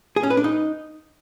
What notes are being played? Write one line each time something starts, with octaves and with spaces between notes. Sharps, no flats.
G#4
C#4
B4
D4
D#4